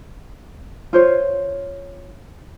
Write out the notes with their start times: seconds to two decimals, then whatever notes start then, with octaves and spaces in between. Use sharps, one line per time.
0.93 F4 C5 C#5